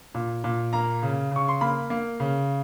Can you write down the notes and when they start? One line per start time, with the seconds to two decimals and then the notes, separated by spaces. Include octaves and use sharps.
0.15 A#2
0.44 A#2
0.73 A#3 A#5
1.03 C#3
1.31 C#3 C#6
1.48 C6
1.61 A#3 B5
1.90 A#3
2.20 C#3